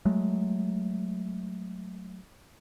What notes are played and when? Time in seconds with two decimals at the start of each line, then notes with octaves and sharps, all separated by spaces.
0.05 F#3 G#3 A3